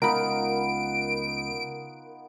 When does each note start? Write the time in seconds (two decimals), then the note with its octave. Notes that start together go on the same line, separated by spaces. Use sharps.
0.02 C#2 B3 D#4 F4 A#4 B5 D7